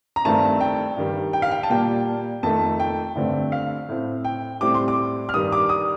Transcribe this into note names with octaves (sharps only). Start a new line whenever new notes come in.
A#5
G2 D#3 A3 C4 A5
G5
G2 D#3 G3
G5
F5
G5
A5
A#2 G3 A#3 G5
F2 D#3 A3 A5
G5
G2 D3 A3 C4
F5
A2 A3 C4
G5
A2 G3 C4 D6
C6
D6
F6
G2 D#3 G3 D#6
D6
D#6